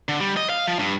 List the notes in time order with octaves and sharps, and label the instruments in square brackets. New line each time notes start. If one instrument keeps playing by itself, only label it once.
[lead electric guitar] D3
G3
D#5
F5
F3
G2